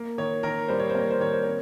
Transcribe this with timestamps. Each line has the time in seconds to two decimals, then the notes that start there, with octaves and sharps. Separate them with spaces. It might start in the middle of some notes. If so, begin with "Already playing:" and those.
Already playing: A#3
0.18 D#3 C#5
0.43 D#3 A#4
0.68 G3 C5
0.79 C#5
0.89 C5
0.95 A#3
1.00 C#5
1.10 C5
1.20 D#3 C#5
1.32 C5
1.42 C4 C#5